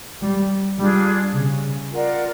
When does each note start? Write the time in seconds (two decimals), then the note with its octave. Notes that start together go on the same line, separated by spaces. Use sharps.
0.22 G3
0.79 G3 D4 F4 G#4
1.36 C#3
1.92 F4 A#4 D5 F#5